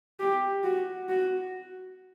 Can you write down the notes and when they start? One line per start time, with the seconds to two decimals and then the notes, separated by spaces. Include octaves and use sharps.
0.20 G4
0.64 F#4
1.09 F#4